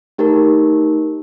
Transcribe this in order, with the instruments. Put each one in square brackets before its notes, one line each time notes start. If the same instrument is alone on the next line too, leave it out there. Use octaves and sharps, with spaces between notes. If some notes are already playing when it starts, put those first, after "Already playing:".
[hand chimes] A3 D#4 G4 A#4